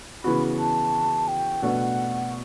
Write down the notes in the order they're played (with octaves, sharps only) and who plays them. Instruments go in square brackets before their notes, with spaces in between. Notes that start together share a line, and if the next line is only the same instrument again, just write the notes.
[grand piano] C#3 E3 B3 F#4 [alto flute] B5
[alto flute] A5
G5
[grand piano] B2 A3 D4 F#4 B4 [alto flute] F#5